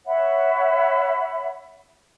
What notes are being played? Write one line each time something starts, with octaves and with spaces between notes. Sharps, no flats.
C#5 E5 F#5 B5